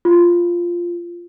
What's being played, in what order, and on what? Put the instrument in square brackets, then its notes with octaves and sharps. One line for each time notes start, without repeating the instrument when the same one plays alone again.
[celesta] F4